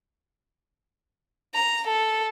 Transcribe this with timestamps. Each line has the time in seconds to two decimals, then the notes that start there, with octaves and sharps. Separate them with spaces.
1.54 A#5
1.87 A4